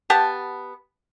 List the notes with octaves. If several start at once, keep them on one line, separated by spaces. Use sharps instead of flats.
B3 G4 F#5 A5